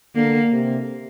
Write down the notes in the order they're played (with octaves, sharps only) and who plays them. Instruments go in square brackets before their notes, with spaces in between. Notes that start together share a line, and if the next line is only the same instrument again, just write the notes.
[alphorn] D3 [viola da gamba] A#3
[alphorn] C3